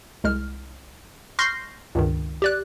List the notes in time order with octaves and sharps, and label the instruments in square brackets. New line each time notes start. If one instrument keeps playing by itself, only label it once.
[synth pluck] C2 G#3 F6
C6 C#6 F6 G6 A#6 C7
C#2 G2 D#3
G4 D5 F#6